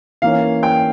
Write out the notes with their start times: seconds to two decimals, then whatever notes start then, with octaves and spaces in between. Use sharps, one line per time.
0.22 E3 A#3 C#4 F5
0.63 G5